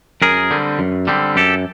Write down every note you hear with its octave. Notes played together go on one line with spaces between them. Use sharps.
F#2 G#4 A#4
D3 G3 C4
F#2
D3 G3 C4
F#2 G4 A4